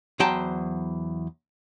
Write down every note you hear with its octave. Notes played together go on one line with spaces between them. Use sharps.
E2 F#3 C5 G5 A5